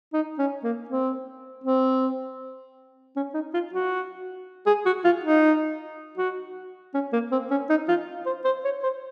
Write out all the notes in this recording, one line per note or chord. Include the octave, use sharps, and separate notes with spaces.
D#4
C#4
A#3
C4
C4
C#4
D#4
F4
F#4
G#4
F#4
F4
D#4
F#4
C#4
A#3
C4
C#4
D#4
F4
C5
C5
C#5
C5